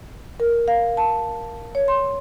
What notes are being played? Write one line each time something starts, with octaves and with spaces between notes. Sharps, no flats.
A#4
F5
A5
C#5
C6